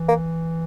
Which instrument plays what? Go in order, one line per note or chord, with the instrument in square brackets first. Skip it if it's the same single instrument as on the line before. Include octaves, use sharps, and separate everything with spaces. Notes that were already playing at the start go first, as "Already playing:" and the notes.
Already playing: [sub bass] E3
[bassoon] A#3